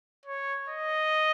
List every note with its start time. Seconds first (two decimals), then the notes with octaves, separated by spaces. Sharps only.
0.26 C#5
0.69 D#5